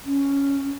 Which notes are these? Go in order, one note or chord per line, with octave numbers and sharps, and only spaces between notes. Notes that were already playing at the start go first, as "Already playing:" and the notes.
C#4